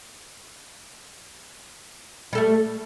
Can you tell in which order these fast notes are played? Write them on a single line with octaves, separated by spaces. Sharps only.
G3 A4 A3